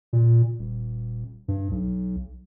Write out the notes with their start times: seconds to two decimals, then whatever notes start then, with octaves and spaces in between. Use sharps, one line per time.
0.13 A#2
0.59 D#1
1.48 G2
1.71 B1